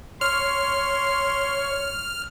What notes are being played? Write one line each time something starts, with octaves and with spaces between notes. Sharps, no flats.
C#5 C6 F6